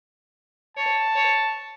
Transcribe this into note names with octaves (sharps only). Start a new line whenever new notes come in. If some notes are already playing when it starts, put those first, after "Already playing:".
C#5 A5
C#5